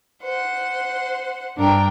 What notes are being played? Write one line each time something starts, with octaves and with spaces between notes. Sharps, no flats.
C5 F#5
G2 D4 A#4 G5